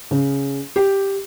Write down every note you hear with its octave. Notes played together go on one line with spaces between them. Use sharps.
C#3
G4